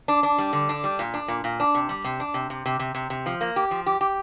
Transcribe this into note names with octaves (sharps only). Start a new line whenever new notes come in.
D4
D4
G3
D3
D4
G3
A#2
D4
A#2
A#2
D4
C3
G3
C3
D4
C3
C3
C3
C3
C3
C3
F3
A#3
G4
F3
G4
G4